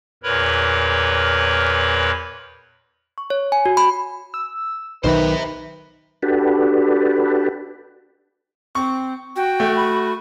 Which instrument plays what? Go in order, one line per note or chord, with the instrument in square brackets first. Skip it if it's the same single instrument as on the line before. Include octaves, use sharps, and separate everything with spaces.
[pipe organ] E2 A#2 A#4 B4 C#5 B5
[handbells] C#6
C#5
G#5
F#4
B5
[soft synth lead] E6
[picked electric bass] B1 D#3 [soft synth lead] D#4 [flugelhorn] B4 [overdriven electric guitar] C5 E5
[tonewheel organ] D4 F#4 G4 A4 B4
[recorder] C4 [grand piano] C#6
[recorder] F#4 [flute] G5
[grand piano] A3
[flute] B5